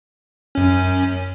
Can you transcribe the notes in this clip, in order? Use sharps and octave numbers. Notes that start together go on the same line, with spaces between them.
F#2 C#4